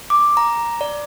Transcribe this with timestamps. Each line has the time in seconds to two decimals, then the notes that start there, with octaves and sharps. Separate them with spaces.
0.10 D6
0.37 A#5
0.81 D5